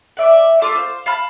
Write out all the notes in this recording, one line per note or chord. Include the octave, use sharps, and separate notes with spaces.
D5 E5 F#5
A3 F4 D6 E6
C5 F5
F5 A5 B5 F6